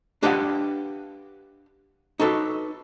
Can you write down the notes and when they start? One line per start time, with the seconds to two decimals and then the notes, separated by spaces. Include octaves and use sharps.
0.23 D4 G4 B4 D#5 F5 F#5
2.19 D#4 F#4 A4 B4